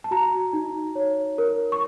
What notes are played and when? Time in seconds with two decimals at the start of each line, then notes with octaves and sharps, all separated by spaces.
0.04 A5
0.11 F#4 A#5
0.53 D#4
0.95 C#5
1.38 A#4
1.72 C#6